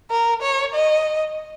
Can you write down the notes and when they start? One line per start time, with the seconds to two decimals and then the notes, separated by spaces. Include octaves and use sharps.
0.11 A#4
0.42 C#5
0.74 D#5